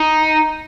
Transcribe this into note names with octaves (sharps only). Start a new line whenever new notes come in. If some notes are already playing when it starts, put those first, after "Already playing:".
Already playing: D#4